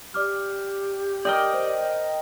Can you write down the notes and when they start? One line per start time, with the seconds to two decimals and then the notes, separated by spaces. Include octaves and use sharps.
0.14 G4 D5 D6 F6
1.25 A#4 D5 D#5 G5 D6 G6 G7
1.53 C5